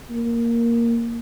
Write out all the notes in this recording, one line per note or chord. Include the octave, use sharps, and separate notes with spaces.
A#3